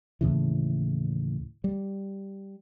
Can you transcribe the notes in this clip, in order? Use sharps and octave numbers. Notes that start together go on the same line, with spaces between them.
D#2 A2 C#3 E3
G3